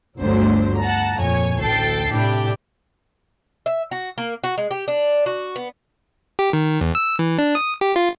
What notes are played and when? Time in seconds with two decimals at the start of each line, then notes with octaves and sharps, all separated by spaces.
0.21 G1 D2 D3 F#3 C5
0.79 F#5 A5 A#5
1.17 F2 A#2 C#5 G#5
1.60 A1 D2 A4 G5 A6 C7
2.12 A2 C3 D4 E4 G4
3.66 E5
3.91 F#4
4.18 A#3
4.44 F#4
4.58 G#3
4.71 G4
4.88 D4
5.26 F#4
5.56 B3
6.39 G4
6.53 D#3
6.81 E2
6.95 E6
7.19 E3
7.38 D4
7.55 D#6
7.81 G4
7.96 F4